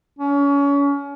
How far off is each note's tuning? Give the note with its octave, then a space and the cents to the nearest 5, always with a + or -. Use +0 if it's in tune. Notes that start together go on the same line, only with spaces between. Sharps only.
C#4 +30